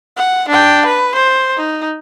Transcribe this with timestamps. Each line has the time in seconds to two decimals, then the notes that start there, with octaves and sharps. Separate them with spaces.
0.17 F#5
0.48 D4 G5
0.86 B4
1.15 C5
1.57 D#4